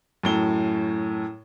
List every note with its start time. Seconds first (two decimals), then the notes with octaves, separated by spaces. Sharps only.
0.23 F#2 A2 G7